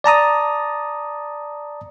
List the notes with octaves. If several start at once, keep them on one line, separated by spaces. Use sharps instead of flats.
D5 A5 A#5 D#6